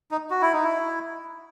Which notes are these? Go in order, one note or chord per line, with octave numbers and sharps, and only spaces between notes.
D#4
F#4
E4
D#4
E4